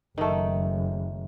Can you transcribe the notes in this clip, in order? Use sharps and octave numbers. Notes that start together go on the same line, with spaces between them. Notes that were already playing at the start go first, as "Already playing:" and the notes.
F#1 D#3 A3